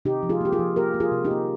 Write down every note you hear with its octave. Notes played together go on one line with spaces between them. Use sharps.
C3 D#4 G4
F3
F4 G#4
A#3 G4
F4 G#4
F3
A#3 G4 A#4
A#3
F4 G#4
C3
D#4 G4
A#3